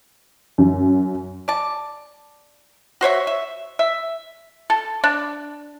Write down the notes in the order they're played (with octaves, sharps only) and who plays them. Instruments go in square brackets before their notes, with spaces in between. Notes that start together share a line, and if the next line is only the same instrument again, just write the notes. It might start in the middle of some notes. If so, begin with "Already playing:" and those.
[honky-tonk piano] F#2
[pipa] D5 A5
F#4 C5 C#5 E5
E5
E5
A4
D4